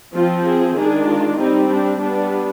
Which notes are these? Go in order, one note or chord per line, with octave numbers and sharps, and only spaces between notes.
F3 C4 F4
G#4
D#3 G#3 D4 G#4
F4
G3 C4 D#4
D4
G3 B3 D4